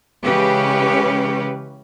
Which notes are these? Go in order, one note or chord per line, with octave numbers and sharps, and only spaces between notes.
C#3 E3 G#3 C#4 G4 B4